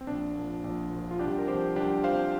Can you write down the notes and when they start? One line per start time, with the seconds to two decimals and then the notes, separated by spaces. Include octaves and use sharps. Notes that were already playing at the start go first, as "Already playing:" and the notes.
0.01 C4
0.07 A#1 D4
0.35 A#2 F3
0.64 A#1
0.91 A#2 F3
1.11 F4
1.19 C2 D4 G4
1.39 A#4
1.48 C3 F3 G4 C5
1.76 C2 D4 G4
2.04 C3 F3 C5 F5